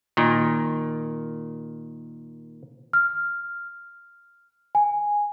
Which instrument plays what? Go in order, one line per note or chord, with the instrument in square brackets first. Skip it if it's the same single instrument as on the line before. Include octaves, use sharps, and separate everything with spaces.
[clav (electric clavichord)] A#2 D#3
[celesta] F6
G#5